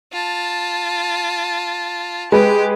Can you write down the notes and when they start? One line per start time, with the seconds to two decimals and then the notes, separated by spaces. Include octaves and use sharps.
0.13 F4 A5
2.32 G#3 G4 B4